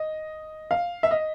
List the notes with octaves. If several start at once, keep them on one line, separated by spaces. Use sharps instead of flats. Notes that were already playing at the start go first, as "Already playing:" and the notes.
Already playing: D#5
F5
E5
D#5